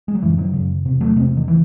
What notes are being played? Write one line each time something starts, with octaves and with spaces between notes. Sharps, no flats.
G#3
F#3
F#2 C#3 E3
D#3 F#3
F#2 C#3
E2 C3
F#3 A3
E2 C3 G#3 C4
D#3
C#3 E3